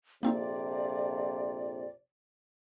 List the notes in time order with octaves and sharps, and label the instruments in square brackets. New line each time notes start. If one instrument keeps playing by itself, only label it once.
[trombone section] A#1 F2 C3 [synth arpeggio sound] A#3 C4 D#4 [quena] D5